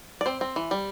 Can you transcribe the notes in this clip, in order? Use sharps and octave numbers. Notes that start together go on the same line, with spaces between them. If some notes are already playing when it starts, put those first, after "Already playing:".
D5
C4 C5
C4
E3
G3